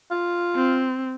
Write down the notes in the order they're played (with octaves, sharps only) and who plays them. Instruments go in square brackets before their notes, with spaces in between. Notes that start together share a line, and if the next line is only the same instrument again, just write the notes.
[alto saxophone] F4
[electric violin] C4